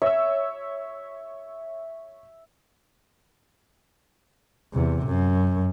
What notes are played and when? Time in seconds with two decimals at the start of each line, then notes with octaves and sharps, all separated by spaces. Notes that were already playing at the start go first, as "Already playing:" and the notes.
0.02 C#5 E5 E6
4.73 E2 C3
5.06 F#2